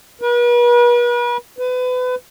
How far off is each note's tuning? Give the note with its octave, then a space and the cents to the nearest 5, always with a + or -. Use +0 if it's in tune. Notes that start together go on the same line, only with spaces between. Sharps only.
B4 -40
B4 +30